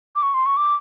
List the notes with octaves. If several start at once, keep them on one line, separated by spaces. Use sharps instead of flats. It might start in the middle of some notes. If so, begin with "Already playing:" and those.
D6
C#6
C6
C#6
D6